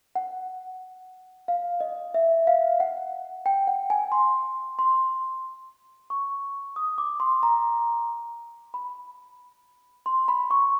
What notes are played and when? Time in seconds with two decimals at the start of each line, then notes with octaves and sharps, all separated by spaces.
0.15 F#5
1.48 F5
1.80 D#5
2.14 E5
2.47 F5
2.80 F#5
3.46 G5
3.67 F#5
3.90 G#5
4.12 C6
4.79 C6
6.10 C#6
6.76 D#6
6.98 D6
7.20 C6
7.43 A#5
8.74 B5
10.06 C6
10.28 B5
10.51 C#6